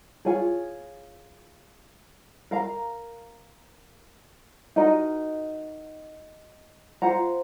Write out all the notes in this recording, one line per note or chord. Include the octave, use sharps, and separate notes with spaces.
F4 G#4 C#5 G#5
A#4 F5 A#5
D#4 F#4 A#4 D#5
F4 C5 F#5 A#5